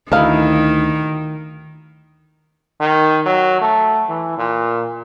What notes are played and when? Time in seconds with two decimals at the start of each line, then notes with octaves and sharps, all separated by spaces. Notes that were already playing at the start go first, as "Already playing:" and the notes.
0.12 D2 D#3 D#4 E4 A4 F5
2.81 D#3
3.26 F#3
3.61 A3
4.09 E3
4.38 A#2